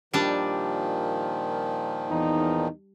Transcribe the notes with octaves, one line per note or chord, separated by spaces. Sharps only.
A#2 D#3 F3 G3 D4
E2 D#4